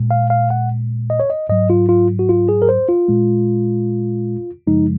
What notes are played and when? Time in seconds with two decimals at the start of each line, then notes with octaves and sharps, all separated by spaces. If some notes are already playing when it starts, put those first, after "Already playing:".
Already playing: A#2 G#3
0.11 F5
0.30 F5
0.50 F#5
1.10 D#5
1.20 C#5
1.30 D#5
1.49 G#2 F#3 D#5
1.70 F4
1.89 F4
2.19 F#4
2.29 F4
2.49 G#4
2.62 A#4
2.69 C5
2.89 F4
3.08 A#2 G#3
4.67 F#2 C#3 F3 G#3 D#4